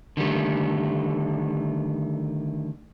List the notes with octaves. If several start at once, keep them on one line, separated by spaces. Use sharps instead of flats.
D3 D#3 G3 A3